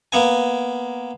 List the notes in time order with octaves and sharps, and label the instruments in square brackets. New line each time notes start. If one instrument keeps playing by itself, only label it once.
[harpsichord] A#3 B3 G#5